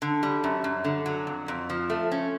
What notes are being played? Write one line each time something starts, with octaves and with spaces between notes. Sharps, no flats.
D3
G3
F#2
F#2
D3
F#3
F2
F2
F3
A3
C#4